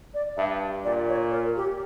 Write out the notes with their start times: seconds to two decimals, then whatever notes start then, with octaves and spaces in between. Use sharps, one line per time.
0.14 D5
0.37 G2 E5
0.84 A#2 D5
1.08 C#5
1.31 A#4
1.56 G4